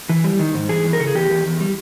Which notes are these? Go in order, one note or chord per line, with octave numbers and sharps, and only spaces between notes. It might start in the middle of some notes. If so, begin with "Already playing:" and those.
E3
G3
D#3
G#2
E3 G#4
E2
A#4
C#3 A4
G#4
E2 G4
E2
E2
G3